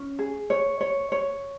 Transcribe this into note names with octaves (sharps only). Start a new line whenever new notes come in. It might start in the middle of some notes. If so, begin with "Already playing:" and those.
Already playing: C#4
G#4
C#5
C#5
C#5